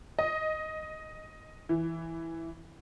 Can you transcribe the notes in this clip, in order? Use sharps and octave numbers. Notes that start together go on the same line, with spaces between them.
D#5
E3